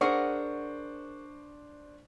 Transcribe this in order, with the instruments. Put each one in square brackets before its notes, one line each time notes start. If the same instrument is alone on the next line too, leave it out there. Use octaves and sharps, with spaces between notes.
[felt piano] D4 C5 C#6 [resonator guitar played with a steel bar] G#4 A#4 F#5